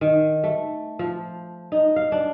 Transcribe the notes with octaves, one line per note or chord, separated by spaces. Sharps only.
D#3
A3
F3
D#4
F5
D4